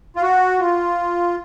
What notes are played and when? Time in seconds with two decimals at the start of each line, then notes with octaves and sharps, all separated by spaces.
0.16 F4
0.22 F#4
0.59 F4